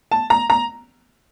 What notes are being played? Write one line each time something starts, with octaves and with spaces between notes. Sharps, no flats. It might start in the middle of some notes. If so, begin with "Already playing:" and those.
A5
A#5
A#5